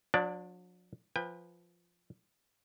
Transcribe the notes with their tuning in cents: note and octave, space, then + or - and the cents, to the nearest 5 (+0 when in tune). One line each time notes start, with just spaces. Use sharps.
F#3 -45 D4 +0 D5 +0
F3 +0 B4 -5 G5 +35